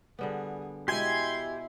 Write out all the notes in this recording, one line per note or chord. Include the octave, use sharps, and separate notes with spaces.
D3 G3 B3 G#4
B2 G#3 E4 G4 G#5 C6 G#6